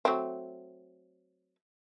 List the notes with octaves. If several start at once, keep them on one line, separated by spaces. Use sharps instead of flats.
F#3 A3 C4